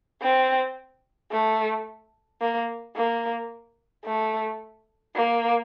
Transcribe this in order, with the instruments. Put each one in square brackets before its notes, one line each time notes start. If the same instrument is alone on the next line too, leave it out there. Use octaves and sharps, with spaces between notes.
[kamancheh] C4
A3
A#3
A#3
A3
A#3